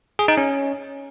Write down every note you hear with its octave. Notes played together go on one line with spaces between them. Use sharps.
G#4
D#4
C#4